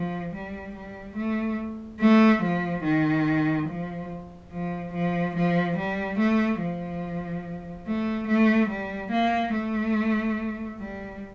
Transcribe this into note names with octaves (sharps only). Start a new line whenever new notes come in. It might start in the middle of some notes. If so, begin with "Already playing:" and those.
Already playing: F3
G3
G3
A3
A3
F3
D#3
F3
F3
F3
F3
G3
A3
F3
A3
A3
G3
A#3
A3
G3